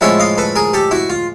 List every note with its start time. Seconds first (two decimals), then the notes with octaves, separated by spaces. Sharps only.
0.01 A2 F3 G#3 C#4 E4 E5 F#5
0.20 D#5 F5
0.38 A4 B4
0.56 G#4 A#4
0.74 G4 A4
0.91 E4 F#4
1.10 F4